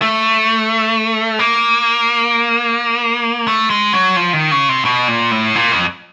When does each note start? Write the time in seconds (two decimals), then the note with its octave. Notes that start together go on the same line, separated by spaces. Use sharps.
0.02 A3
1.39 A#3
3.48 A3
3.70 G#3
3.93 F#3
4.16 F3
4.33 D#3
4.51 C#3
4.69 C3
4.85 B2
5.08 A#2
5.31 A2
5.55 A#2
5.72 F2